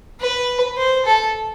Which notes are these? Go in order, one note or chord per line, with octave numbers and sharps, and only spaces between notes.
B4
C5
A4